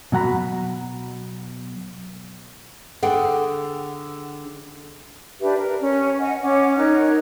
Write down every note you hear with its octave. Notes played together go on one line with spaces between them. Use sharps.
B2 F#3 F#5 A#5 B5
D3 G#4 F#5 G5
D4 G4 B4 E5
A#4
C#4
D#5 F#5 G#5
C#4 C#5 F#5 D6
D#4 A#4 C#5 F#6